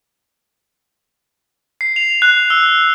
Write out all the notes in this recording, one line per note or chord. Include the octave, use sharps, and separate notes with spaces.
C7
F7
F#6
E6